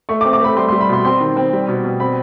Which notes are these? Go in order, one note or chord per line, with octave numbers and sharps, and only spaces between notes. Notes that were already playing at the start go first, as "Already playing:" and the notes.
A3 C#6
D6
C4
D6
A3 B5
G3 C6
C6
G3
B5
B2 C6
C4 C6
D#3
C4
G3
B2
B2
C4 B5